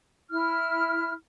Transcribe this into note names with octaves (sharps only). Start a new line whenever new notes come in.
E4 F6